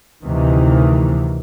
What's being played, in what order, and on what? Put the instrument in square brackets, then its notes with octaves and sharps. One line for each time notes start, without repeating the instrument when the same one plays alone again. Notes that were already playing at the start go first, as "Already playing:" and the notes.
[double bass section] D2 C3 D#3 E3